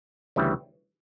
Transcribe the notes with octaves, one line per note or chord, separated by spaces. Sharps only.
D2 C#3 E3 G3